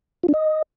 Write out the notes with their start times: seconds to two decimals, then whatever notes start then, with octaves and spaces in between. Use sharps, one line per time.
0.23 F4
0.29 D4
0.34 D#5